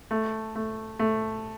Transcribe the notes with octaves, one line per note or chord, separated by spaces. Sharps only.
A3
A3
A3